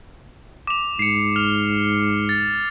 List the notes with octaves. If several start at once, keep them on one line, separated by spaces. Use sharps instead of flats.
D6 F7
G#2 C7 C#7
F6 F7
A6